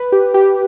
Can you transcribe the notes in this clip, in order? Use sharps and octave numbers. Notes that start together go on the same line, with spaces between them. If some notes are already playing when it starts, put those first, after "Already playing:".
Already playing: B4
G4
G4